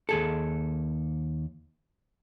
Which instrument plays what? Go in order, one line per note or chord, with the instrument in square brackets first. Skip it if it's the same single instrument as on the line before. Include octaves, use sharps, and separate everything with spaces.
[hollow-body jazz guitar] D#2 G#4 A4